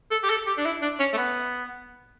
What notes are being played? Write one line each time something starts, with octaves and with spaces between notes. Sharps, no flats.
A4
G4
A4
G4
D4
E4
D4
C#4
A3
B3